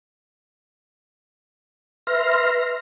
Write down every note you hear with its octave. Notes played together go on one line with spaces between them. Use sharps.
B4 E5 C6 F6 A#6